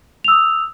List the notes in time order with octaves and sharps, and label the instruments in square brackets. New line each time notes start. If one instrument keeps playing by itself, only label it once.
[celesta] F7
E6
D#6